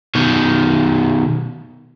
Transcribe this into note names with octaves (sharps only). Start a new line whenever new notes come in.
B2 D#3